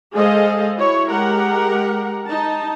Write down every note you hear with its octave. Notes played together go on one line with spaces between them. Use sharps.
G#3 G#4 A4 C5 D#5 F5
E4 F#4 C#5
G#3 G4 A#4 F#5
D#4 A5